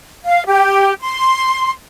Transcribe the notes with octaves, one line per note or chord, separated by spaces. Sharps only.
F5
G4
C6